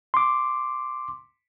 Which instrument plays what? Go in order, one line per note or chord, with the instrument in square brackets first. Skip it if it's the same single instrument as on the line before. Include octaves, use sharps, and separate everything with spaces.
[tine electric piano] C6 D6